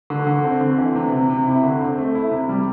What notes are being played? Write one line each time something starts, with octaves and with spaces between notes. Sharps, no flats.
D3
D3
C4
D3
E3
C3
C3
C3
E4
D3
C4
A3
E4
C3
G3